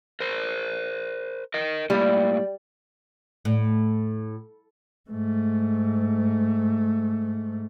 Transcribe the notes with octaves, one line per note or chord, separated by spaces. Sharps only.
A#4 C5
A#4 D#5
A2 G3 A#3
A2
G#2 A3